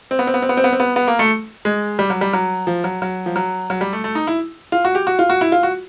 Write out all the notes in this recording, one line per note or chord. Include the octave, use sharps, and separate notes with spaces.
C4
B3
C4
B3
C4
B3
C4
B3
C4
B3
B3
A#3
A3
G#3
G3
F#3
G3
F#3
F3
F#3
F#3
F3
F#3
F#3
G3
A3
A3
D#4
E4
F4
F#4
G4
F#4
F4
F#4
E4
F4
F#4